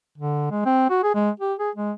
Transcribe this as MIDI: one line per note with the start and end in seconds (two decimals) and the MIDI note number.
0.18 0.51 50
0.51 0.61 56
0.66 0.90 60
0.90 1.03 66
1.03 1.15 68
1.15 1.30 56
1.40 1.54 67
1.59 1.70 68
1.75 1.92 56